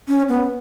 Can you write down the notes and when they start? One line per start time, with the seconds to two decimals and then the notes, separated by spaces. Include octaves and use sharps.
0.08 C#4
0.29 B3